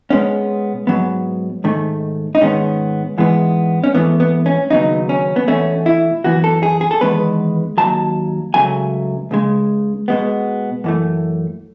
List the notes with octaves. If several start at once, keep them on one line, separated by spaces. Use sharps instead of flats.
B2 G#3 B3 C#4
G#2 F#3 B3
G#2 D#3 A3
D#4
G#2 D#3 G#3 B3 C#4
G#2 E3 G#3 B3
C#4
G#2 E3 A3 B3
B3
C#4
D#2 C#3 F#3 B3 D#4
C#4
B3
E2 B2 A3 C#4
E4
F#2 E3 B3 F#4
A4
G#4
G#4
A4
E2 D#3 G#3 B3 B4
D#2 C#3 F#3 A5
C#2 C#3 F#3 A3 G#5
C#2 C#3 G#3
B2 G#3 B3
F#2 E3 A3